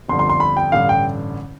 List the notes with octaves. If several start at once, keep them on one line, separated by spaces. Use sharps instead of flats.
G1 F2 D3 G3 C6
C6
C6
B5
G5
A1 G2 D3 G3 F5
G5